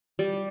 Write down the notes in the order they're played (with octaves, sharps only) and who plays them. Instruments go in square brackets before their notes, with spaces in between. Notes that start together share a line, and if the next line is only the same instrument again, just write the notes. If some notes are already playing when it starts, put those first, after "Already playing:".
[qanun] G3